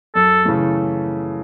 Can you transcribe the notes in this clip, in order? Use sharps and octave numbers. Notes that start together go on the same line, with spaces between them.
F#2 A4
C#3 E3 A3